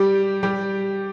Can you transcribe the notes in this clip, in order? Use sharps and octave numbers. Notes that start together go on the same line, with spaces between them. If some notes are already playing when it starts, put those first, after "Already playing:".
Already playing: G3 G4
G3 G4